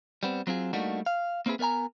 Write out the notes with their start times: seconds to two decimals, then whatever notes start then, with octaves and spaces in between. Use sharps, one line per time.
0.23 G3 B3 C4
0.47 F#3 C4 F4 G#4
0.73 G3 A3 A#3 D4 D#4 F#4
1.06 F5
1.46 A#3 C4 D#4 E4 G#4 B4
1.59 B3 A#4 D5 G#5 A#5